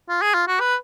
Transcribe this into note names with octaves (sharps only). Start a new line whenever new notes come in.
F4
G#4
F4
F#4
B4